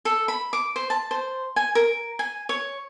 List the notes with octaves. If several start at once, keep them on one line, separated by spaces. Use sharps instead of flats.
A4
B5
D6
C5
A5
C5
G#5
A#4
G#5
C#5